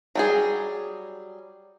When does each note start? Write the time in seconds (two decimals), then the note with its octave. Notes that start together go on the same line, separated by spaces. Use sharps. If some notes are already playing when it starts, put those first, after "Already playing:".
0.15 F#3 G3 G#4